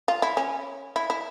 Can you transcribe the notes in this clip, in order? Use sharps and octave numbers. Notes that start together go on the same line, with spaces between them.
F4
E4
C#4
E4
E4